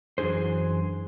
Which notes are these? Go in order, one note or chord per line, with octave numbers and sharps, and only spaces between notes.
F#2 E3 D4 G#4 C5